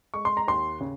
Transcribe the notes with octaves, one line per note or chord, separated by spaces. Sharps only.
G#3 C#6
C6
A#5
D#2 C6
C#3